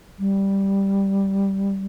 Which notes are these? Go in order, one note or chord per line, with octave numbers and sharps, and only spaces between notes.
G3